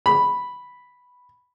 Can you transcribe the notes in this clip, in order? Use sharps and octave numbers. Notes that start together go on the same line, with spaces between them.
B5